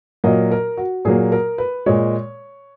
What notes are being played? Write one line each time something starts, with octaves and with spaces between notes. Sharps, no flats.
A#2 F#3 A#3 D#5
A#4
F#4
A#2 F#3 A#3 G#4
A#4
B4
A#2 G#3 C#5